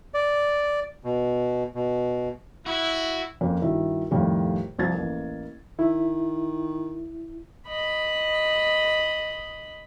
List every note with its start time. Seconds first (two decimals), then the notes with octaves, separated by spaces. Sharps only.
0.14 D5
1.04 B2
1.75 B2
2.66 E4 F#4
3.41 F2 A#3 C#4
3.61 G2 D#3 E4 F#4
4.11 F2 A2 D#3 G3 F4 G4
4.79 C2 F3 G#6 A6
4.94 A1 A#3
5.79 D#3 E4
7.68 D#5 B5